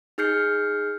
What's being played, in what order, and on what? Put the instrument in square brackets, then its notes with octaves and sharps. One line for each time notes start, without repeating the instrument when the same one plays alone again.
[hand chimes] D#4 G#4 F6 G6 C7 C#7